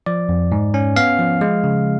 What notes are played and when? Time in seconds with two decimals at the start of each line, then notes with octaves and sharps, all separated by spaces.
0.06 F3 D5
0.29 F2
0.52 G#2
0.74 C#4
0.96 B3 F5
1.19 F3
1.41 G#3
1.64 C#3